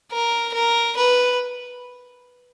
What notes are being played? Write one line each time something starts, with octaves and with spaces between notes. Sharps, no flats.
A#4
A#4
B4